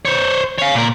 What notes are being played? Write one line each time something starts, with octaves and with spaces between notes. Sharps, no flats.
C5 C#5
C#5 F5
A#2 A#4